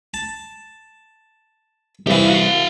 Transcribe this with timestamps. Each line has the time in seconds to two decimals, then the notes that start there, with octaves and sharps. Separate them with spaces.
0.14 A5
2.07 C2 E3 G4 F5
2.30 F#4 F5